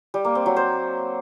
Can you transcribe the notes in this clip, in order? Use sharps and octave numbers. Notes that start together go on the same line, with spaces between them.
G3
A#3
C4
F#3
C5